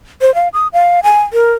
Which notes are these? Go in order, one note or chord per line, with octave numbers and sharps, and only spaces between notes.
C5
F5
D#6
F5
G#5
A#4